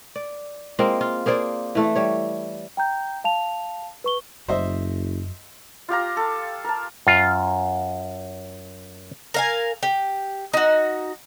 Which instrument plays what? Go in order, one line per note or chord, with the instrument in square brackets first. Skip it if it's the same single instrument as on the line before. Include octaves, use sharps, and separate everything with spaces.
[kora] D5
G#3 A#3 C4 F4
F4
A#3 G#4 C5 D5
E3 A3 A4
G3 C#5
[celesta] G5 A#5 G6
F5 A5 F7
B4 C#6 G7
[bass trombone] F#1 [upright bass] F#2 [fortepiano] C5 D#5 E5
[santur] F4 G4 F5 A#5
A4
A#4 A5
[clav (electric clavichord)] F#2 F4
[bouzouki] A#4 F5 G#5
G4
D#4 F#4